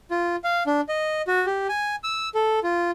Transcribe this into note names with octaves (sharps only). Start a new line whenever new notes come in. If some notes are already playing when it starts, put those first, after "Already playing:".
F4
F5
D4
D#5
F#4
G4
G#5
E6
A4
F4